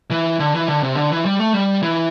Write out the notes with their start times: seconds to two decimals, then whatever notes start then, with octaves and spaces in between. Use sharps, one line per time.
0.11 E3
0.40 D3
0.54 E3
0.68 D3
0.83 C3
0.97 D3
1.12 E3
1.25 G3
1.39 A3
1.54 G3
1.83 E3